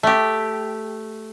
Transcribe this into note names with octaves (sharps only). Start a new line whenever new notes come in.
A3 G4